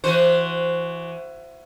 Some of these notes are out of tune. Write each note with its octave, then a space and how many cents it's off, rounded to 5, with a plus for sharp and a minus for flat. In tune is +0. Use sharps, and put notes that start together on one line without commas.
E3 +25 F#4 +0 C5 -5